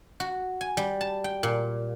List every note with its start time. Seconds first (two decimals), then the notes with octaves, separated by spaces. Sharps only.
0.20 F#4
0.61 G#5
0.77 G3
1.01 A5
1.24 G5
1.43 A#2